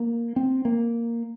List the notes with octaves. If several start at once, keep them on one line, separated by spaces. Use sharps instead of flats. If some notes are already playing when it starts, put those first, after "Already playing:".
Already playing: A#3
C4
A#3